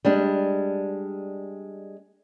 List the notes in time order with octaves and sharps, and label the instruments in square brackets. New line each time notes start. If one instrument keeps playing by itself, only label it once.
[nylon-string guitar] G3 G#3 D4